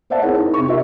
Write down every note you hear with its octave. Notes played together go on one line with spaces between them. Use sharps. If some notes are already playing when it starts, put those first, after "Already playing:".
C5 D5 E5 F#5 A5
C4 E4 G#4 A#4 C#5
D#4
C3 C#6
F4 G4 A#4 D#5 E5